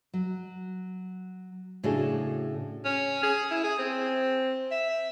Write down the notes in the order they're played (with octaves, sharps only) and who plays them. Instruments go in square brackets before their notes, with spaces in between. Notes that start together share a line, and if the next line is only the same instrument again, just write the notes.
[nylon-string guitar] F#3
A2 C#3 D4 F#4 G#4 A4
[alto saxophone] C#4
G#4
E4
G#4
C4
E5